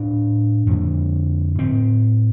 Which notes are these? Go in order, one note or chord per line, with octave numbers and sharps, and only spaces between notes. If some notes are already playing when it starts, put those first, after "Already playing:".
Already playing: A2 D4
F2 D3
A2 C4